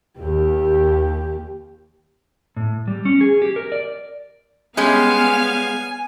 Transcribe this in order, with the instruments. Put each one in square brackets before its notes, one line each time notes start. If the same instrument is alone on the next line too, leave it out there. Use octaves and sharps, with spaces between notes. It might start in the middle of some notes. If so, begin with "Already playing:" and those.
[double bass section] D#2 [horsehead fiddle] G4
[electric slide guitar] A2
G3
C#4
G#4
G4
A#4
D5
[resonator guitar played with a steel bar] G3 G#3 C#4 [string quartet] B3 F5 [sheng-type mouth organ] G#5